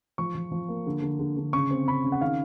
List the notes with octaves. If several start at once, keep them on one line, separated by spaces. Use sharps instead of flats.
F3 C#6
F3
F3
A#3
D3
D3
D3
D3
C#3 C#6
C4
C#3 B5
C#3
F#5
D#3 F5